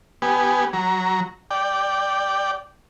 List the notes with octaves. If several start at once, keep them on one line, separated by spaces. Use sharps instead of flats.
B3 G4 G#5
F#3 A#5
D5 G5